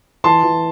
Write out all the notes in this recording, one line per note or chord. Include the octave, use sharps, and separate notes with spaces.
E3 A5 C6
E3